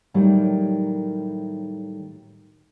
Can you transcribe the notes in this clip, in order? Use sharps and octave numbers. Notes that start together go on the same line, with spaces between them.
A2 D#3 F#3 G3 A#3